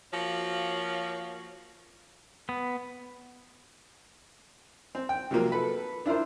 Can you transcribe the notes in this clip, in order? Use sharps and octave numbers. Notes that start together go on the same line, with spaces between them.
F3 A#3 F#4 C#5 F5
B3
C4
G5
C3 F3 F#3 A#3 F4
A4 B4
D4 E4 F4 A#4 C5